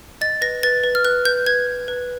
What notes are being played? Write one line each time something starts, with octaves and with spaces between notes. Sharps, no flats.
D#5 A6
B4 A#6
B4 A6
B4
F6
B4 F#6
B4 G6
B4 G#6
B4
B4